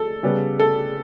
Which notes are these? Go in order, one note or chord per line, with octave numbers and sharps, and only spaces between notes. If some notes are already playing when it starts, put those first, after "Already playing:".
Already playing: A4
C#3 G3 B3
A4